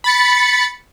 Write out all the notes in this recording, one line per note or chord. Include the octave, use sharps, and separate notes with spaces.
B5 A6 C#7